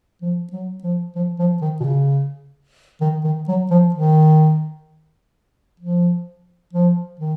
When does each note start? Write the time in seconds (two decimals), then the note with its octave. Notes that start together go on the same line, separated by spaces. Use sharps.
0.22 F3
0.52 F#3
0.83 F3
1.15 F3
1.39 F3
1.61 D#3
1.80 B2
1.84 C#3
3.01 D#3
3.24 D#3
3.48 F#3
3.70 F3
3.95 D#3
5.80 F3
6.73 F3
7.20 D#3